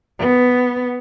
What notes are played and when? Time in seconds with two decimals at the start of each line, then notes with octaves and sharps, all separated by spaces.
0.19 B3